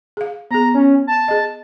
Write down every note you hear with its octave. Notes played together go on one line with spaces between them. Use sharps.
G#4 F5
B3 G#4 A#5
C#4
A5
G#4 D#5